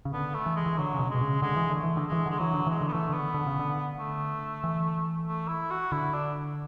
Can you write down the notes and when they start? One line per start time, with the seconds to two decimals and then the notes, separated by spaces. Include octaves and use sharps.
0.05 C#3
0.13 D3 B3
0.34 A3
0.46 E3
0.56 G#3
0.66 E3
0.77 D3 F#3
0.94 C#3
0.99 B2
1.10 B2 G#3
1.21 C#3
1.42 D3 G#3
1.56 E3
1.70 D3 A3
1.83 E3
1.97 D3
2.07 G#3
2.12 E3
2.26 D3 G#3
2.38 E3 F#3
2.54 D3
2.67 E3 G#3
2.81 D3
2.88 B3
2.92 E3 A3
3.09 D3 B3
3.34 D3
3.46 C#3
3.59 D3
3.99 A3
4.64 E3
5.27 A3
5.48 E4
5.70 F#4
5.92 D3 E4
6.14 D4